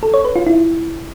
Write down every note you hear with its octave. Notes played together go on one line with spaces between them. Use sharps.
A4
C#5
B4
F4
E4